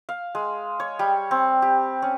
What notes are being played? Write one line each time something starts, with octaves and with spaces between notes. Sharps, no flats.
F5
G#3
C#5
G3
C4
G4
C#4